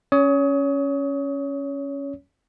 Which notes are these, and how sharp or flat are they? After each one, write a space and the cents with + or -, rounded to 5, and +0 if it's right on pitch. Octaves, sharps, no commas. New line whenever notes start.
C#4 +0 C#5 +25 D#6 +30